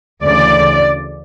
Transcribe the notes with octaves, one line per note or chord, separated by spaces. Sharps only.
D2 C#3 E3 D5